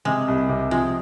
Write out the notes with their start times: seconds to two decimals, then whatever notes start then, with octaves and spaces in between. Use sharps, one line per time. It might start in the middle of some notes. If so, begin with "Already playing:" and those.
0.05 C3 G#3
0.28 C2
0.49 C3
0.71 F3 G#3